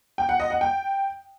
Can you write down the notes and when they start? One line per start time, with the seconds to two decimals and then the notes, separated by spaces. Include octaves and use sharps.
0.18 G5
0.29 F#5
0.40 D#5
0.50 F#5
0.61 G5